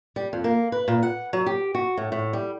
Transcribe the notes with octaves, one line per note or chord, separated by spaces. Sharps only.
G3
F2
A#3
B4
A#2
F#5
F#3
G4
F#4
A2
A2
G3